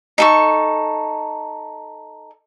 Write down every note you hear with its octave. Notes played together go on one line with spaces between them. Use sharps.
D#4 A4 C#6